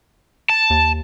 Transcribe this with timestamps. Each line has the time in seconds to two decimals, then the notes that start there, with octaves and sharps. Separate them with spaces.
0.49 A5
0.70 D#2